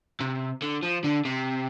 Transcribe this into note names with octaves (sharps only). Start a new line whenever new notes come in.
C3
D3
F3
D3
C3